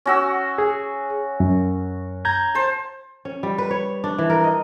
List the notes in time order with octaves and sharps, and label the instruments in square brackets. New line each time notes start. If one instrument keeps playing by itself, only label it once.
[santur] C#4 F#4 E6
[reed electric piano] G#4
F#2
A#5 G6 G#6
[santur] C5 A5
[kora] C#4
G3
B4
C#5
D4
E3
A#4
D#5